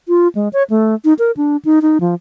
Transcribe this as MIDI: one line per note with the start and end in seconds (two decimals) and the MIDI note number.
0.08 0.28 65
0.35 0.48 56
0.53 0.63 73
0.70 0.95 57
1.05 1.14 63
1.19 1.31 70
1.37 1.57 62
1.65 1.79 63
1.82 1.98 63
2.01 2.14 53